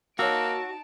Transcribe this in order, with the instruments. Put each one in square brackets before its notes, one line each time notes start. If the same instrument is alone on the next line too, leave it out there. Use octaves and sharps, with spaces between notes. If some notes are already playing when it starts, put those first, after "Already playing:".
[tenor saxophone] A#3 [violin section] D#4 A5 D7 [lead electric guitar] F#4 [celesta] C#5 E6